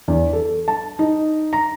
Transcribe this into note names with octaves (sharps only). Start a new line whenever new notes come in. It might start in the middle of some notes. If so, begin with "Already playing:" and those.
E2
A4
A5
D#4
A#5